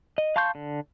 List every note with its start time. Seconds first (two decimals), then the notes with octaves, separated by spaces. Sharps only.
0.18 D#5
0.36 F5 A5 C6 C#6 G6
0.55 D3